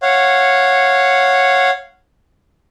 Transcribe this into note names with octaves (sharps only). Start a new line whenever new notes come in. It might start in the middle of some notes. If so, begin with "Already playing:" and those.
C#5 F5 F#5